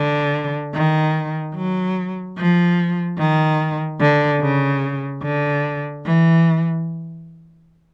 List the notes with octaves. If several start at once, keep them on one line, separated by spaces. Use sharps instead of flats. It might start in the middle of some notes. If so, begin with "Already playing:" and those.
Already playing: D3
D#3
F#3
F3
D#3
D3
C#3
D3
E3